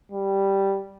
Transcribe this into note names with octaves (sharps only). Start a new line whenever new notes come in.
G3